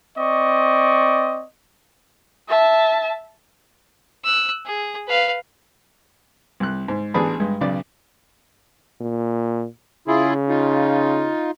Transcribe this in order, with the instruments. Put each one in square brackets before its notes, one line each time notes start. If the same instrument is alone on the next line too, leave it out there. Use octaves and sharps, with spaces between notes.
[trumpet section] C4 D5 D#5 C#6
[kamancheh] E5 A5
[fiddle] E6 F#6
G#4
B4 F5
[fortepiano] C2 F#6
G#2
A1 B3 D4 G#4 D5 B5
G2 G#3
B1 C#3 D5
[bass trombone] A#2
[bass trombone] C#3 [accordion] E4 F4 G#4
[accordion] D#4 F4